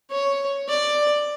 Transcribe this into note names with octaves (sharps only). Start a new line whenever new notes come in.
C#5
D5